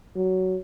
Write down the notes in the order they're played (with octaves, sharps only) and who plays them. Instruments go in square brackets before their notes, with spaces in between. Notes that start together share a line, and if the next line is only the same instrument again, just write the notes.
[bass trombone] F#3